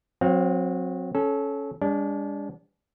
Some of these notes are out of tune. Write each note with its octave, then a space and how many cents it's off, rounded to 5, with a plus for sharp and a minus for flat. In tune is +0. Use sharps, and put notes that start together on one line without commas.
F#3 -25 C4 +0 F5 +30
C#4 +0 A4 -20
G#3 -45 D4 -30